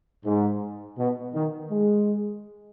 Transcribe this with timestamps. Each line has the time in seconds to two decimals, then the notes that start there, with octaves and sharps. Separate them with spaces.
0.25 G#2
0.98 B2
1.34 D#3
1.70 G#3